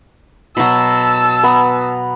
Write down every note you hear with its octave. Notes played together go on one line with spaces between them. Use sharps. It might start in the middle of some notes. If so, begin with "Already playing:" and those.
B2 F#3 A5 E6
B3 A#5